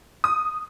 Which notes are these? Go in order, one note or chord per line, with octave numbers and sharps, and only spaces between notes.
D#6